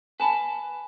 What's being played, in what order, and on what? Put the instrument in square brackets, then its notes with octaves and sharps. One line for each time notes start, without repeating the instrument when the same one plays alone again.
[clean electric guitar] B4 A5 [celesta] G#5 B5